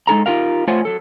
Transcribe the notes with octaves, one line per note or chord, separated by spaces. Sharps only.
G#3 D#4 A4 A#5
D#4 F4 G4 A#4 F5
A3 F4 C5 C#5 F#5 G#5
F#3 A4